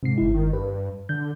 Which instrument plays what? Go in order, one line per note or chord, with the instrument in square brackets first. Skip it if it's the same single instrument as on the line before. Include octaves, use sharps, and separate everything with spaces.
[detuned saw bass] G#2 [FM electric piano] C3 C7
[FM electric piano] G1 E4
[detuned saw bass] D#3
[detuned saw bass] G2 [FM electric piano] B4
[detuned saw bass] D3 [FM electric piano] G6